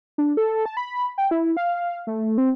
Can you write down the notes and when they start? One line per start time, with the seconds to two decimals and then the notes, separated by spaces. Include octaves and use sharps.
0.18 D4
0.37 A4
0.66 A5
0.77 B5
1.18 G5
1.31 E4
1.57 F5
2.07 A3
2.38 C4